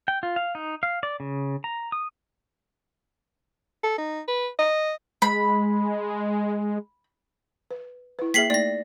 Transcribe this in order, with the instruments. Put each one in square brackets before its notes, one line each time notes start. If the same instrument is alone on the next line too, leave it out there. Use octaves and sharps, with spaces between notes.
[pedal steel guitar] G5
F4
F5
D#4
F5
D5
C#3
A#5
D#6
[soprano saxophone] A4
D#4
B4
D#5
[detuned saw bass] G#3 [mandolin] B5
[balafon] B4
E4 B4
[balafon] A#3 G#4 E5 [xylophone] B6 C7 F#7
[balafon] A3 A#3 D#4 [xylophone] D5 A#6